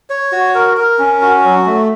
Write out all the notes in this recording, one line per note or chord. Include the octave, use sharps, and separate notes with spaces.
C#5
F#4
A#4
A#4
C#4
F#4
F#3
A3